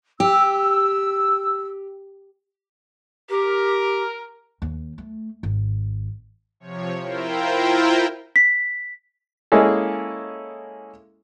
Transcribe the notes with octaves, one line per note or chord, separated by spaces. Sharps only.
G4 E6
G4 A#4
D#2
A3
G#1
C3 F3 C#5
E4 F4 A#4 C5 G5
B6
G#3 A#3 C#4 E4 G#4 A4